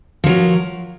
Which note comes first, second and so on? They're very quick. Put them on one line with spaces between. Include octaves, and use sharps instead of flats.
F3 F#3 A#4